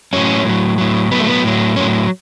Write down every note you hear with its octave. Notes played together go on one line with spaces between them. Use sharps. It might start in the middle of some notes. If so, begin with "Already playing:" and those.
A2 F#3 C#4
A2 F#3
A2 F#3
A2 F#3 B3
A3
B3
A2 F#3
A2 F#3 C#4